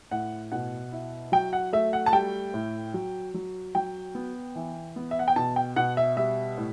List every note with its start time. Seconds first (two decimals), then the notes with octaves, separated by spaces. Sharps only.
0.11 A2 F#5
0.52 B2 F#5
0.92 E4
1.32 F#3 G5
1.53 F#5
1.73 A3 E5
1.93 F#5
2.06 A5
2.13 G3 G5
2.54 A2
2.94 F#3
3.34 F#3
3.75 F#3 G5
4.15 B3
4.56 E3
4.96 B3
5.11 E5
5.19 F#5
5.28 G5
5.36 B2 A5
5.56 G5
5.76 B2 F#5
5.97 E5
6.17 G3 E5
6.58 A2